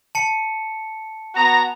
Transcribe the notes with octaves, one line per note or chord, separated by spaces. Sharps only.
A5 C#7
B3 F#4 A#5